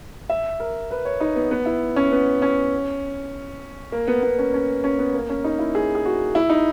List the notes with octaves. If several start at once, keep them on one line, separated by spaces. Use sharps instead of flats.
E5
A#4
B4
C#5
D#4
B3
B3
E4
C#4
B3
C#4
A#3
B3
B3
C#4
C#4
C#4
B3
A#3
C#4
D#4
E4
G#4
G#4
F#4
E4
D#4